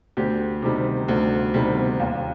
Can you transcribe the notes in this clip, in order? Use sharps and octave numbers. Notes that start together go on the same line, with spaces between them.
D2 G4
C3 D#3 G3
D2
C3 D#3 G3
D#2 F4